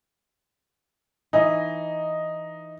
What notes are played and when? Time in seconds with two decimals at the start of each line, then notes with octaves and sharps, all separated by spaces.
1.33 E3 D#4 E4 D#5